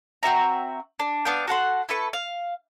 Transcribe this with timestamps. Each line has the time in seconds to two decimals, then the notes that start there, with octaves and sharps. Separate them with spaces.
0.23 C4 F#4 E5 A#5
1.00 D4
1.25 B3 D4 F5 G5
1.47 F#4 A4 F#5 C6
1.89 E4 A4 B4 C#6
2.13 F5